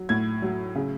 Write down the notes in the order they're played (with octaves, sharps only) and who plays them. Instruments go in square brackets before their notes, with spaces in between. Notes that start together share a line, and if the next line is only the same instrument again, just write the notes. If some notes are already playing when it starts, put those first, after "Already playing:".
Already playing: [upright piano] F#3
A2 G#6
F#3
C#3